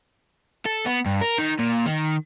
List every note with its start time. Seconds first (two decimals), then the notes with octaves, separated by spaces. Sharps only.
0.66 A4
0.86 B3
1.06 G2
1.21 A#4
1.39 D#3
1.59 A#2
1.86 D#3